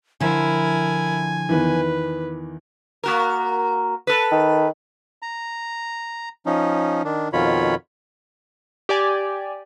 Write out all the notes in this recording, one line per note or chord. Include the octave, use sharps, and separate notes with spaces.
D3 F3 E4 A#4 E5 G#5
E2 D#3 E3 B4
A#3 F#4 A#4
A4 B4
D#3
A#5
F3 C#4 D#4
D#3 D4
F2 B2 D#3 F4 C#5 B5
G4 D5 G#5